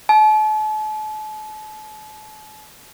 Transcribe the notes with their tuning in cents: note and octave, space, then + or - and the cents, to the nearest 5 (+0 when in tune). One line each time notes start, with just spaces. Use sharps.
A5 -40